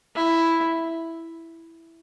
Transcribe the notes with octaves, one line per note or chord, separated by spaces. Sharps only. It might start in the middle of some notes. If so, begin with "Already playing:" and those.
E4